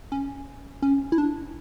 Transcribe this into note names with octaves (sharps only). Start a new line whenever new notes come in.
C#4
C#4
E4
D4